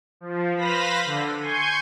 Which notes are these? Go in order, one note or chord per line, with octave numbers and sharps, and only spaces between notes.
F3
B4 C5 F5 B5 A#6 B6
D3
G#5 C6 C#6 G6 G#6